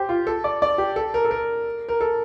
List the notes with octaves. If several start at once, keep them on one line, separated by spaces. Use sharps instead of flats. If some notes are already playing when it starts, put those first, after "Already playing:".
Already playing: G4 C5
F4
A4
D5
D5
G4
A4
A#4
A4
A#4
A#4
A4